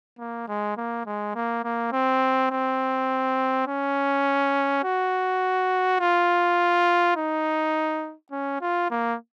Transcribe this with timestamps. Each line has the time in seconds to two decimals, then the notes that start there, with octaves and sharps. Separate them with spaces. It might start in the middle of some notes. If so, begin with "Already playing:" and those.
0.19 A#3
0.48 G#3
0.77 A#3
1.06 G#3
1.35 A#3
1.64 A#3
1.92 C4
2.51 C4
3.67 C#4
4.84 F#4
6.00 F4
7.16 D#4
8.31 C#4
8.62 F4
8.91 A#3